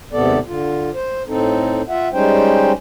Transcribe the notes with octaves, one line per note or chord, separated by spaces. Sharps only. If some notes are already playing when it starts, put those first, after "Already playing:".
D#2 G#2 C3 B3 A4 D5
D3 F4
C5
A2 C4 D#4 A4
F4 E5 F#5
G3 G#3 C#4 D#4 C5 G5